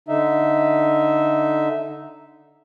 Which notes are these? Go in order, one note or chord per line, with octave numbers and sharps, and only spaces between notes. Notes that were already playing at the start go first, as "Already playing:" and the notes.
D3 D#4 E5